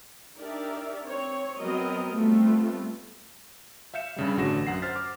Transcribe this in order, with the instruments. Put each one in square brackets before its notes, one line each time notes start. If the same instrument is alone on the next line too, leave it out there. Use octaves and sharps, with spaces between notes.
[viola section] D4 D#4 G4 A#4 D5 E5
C4 C#5
F#3 B3 C4 A#4 D#5
G3 A3 B3 C4 F4
[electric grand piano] E5 F5 G6 C#7 E7
G2 C#3 G3
A1 D3 F#4 A#6 E7
F#2 F#5 C7
C5 F6 A6 B6
D6